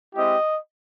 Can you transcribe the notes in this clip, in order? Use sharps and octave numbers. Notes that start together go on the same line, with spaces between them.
G#3 C4 E4 G4 D#5